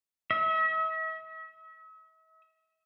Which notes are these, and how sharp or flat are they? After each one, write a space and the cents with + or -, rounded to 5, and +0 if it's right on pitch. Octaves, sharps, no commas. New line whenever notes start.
E5 -45